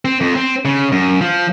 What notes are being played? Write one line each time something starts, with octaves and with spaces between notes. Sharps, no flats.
C4
F2
C4
C#3
F#2
F3